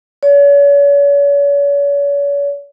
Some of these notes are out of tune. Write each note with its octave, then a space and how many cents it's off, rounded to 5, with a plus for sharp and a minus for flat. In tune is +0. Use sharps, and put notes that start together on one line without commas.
C#5 +40